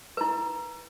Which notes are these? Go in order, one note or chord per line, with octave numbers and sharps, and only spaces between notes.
E4 B4